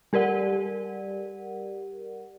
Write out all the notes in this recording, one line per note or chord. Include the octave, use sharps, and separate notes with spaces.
G3 G4 A#4 D5 F#5